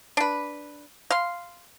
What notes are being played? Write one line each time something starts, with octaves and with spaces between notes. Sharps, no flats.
D4 B4
F5 C6